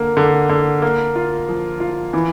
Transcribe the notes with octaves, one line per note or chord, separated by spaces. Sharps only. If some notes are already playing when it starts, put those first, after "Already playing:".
Already playing: D3 A#3
D3
D3
A#3
F4
F3
F4
E3